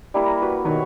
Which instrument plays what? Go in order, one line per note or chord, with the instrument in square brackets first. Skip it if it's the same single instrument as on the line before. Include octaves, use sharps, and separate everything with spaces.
[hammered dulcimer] G3 A#3 E4
[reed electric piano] A#5
[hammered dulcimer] F#4 [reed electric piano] B4
[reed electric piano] B2 D#3 [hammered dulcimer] B4 C#5 C#6